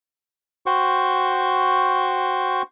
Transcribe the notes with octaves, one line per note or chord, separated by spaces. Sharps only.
F#4 C5 G5 C#6